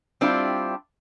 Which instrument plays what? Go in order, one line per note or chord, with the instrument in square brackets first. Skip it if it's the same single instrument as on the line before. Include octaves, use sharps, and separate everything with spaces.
[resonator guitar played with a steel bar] G3 C4 D4 E4 F4 G4